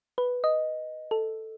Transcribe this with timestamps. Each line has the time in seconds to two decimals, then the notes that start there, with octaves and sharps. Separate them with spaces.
0.18 B4
0.44 D#5
1.11 A4